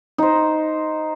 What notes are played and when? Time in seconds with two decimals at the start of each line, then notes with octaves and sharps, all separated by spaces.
0.18 D#4 C5